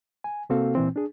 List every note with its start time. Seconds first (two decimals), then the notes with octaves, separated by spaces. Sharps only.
0.24 G#5
0.50 C3 A#3 C4 F#4 A4 F5
0.75 A#2 E3 C4
0.96 D4 G#4